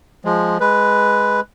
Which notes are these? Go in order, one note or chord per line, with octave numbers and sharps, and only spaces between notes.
F3 G#3
G#3 B4